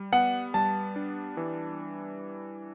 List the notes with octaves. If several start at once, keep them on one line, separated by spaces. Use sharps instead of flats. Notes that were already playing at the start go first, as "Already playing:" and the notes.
Already playing: G3
B3 F#5
G3 A5
D4
E3